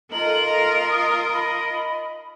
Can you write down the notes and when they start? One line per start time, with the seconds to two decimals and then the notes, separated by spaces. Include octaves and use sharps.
0.12 D#4 F4 A4 A#4 F#7
0.46 D#5 A#5
0.89 D#5 D#6
1.33 B5